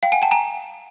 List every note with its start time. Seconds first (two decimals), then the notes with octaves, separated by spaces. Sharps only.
0.03 F5 G5
0.12 F#5 G#5
0.22 G5 A5
0.31 G#5 A#5